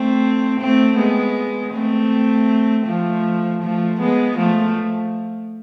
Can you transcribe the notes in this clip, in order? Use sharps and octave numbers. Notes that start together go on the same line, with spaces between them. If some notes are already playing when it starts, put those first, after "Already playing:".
Already playing: A3 C4
A3 C4
G#3 B3
A3 C4
F3 A3
F3 A3
G#3 B3
F3 A3